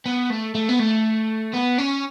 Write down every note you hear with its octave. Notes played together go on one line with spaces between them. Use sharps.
B3
A3
A3
B3
A3
B3
C#4